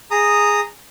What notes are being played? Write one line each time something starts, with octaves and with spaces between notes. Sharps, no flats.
G#4 A#5 D#6